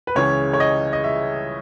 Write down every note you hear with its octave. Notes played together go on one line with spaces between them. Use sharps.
B4
C#2 C#3 E3 C#5
C#5
D#5
D#5
E5